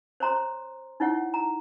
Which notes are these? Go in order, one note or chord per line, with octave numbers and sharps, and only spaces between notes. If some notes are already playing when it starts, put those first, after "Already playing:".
C5 C#5 A#5 C6
D#4 E4 C#5 F#5
A#5